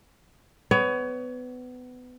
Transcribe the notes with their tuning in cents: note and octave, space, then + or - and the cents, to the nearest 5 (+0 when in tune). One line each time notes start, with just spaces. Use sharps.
B3 +25 C#5 +30